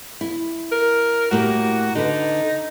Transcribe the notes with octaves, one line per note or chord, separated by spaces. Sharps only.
E4
A#4
A2 A#3 F#4 G4
D3 D#4 B4